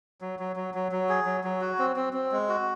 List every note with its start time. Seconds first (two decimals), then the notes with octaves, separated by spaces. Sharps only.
0.21 F#3
0.39 F#3
0.56 F#3
0.74 F#3
0.92 F#3
1.09 G#4
1.26 F#3
1.44 F#3
1.61 F#4
1.79 C4
1.96 C4
2.13 C4
2.32 G#3
2.49 F#4